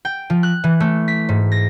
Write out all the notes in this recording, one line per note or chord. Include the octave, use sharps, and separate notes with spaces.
G5
F3
F#6
E3
A3
B6
G#2
A#6